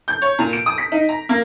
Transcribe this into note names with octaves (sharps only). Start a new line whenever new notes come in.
G6
C#5
A#2
D7
D#6
B6
D#4
A#5
A#3